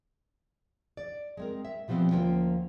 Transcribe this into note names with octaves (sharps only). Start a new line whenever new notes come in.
D5
G#3 C4 A#4
E5
B2 F3 G3 B3 C4
D2 F3 A#3 C#4 F4 G5